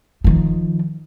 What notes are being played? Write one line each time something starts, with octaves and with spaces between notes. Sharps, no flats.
D#3 F3